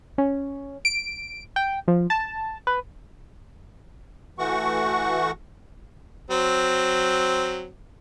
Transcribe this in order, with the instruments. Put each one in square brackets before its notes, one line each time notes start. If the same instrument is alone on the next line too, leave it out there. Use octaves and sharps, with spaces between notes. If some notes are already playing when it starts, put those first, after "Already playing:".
[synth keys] C#4
D7
G5
F3
A5
B4
[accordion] E3 A3 F#4 F#5 C#6
[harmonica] F#3 C4